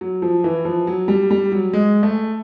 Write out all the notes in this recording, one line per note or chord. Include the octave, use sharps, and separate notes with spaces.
F#3
F3
E3
F3
F#3
G3
G3
F#3
G#3
A3